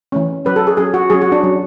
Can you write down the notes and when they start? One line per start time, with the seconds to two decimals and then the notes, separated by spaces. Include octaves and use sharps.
0.12 E3 A3 C#4
0.45 F#3 C#4 B4
0.56 A4
0.67 G#4
0.77 F#3 C#4 G#4
0.94 F#4
1.10 F#3 C#4 G#4
1.22 F#4
1.32 D4
1.43 F#3 C#4